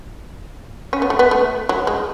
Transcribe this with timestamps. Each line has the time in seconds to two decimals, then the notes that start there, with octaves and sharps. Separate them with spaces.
0.93 C#4
1.02 B3
1.10 A3
1.19 B3
1.31 A3
1.69 F#3
1.87 G#3